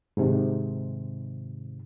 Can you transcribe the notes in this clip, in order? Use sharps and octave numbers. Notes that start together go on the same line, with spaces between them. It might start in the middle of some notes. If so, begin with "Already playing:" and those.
G#2 C3 D#3